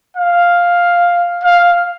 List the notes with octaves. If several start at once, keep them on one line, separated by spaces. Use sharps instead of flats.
F5
F5